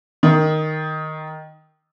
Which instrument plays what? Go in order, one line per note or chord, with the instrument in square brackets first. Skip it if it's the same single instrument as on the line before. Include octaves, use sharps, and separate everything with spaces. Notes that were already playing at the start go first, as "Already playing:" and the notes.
[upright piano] D#3